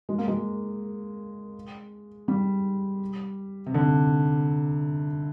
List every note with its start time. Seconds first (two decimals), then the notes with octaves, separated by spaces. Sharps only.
0.09 G#3
0.18 A#3
0.28 G#3
2.28 G3
3.66 C3
3.74 D3